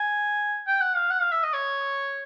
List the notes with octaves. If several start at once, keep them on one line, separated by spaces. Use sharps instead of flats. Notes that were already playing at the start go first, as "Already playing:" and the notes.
Already playing: G#5
G5
F#5
F5
F#5
F5
E5
D#5
C#5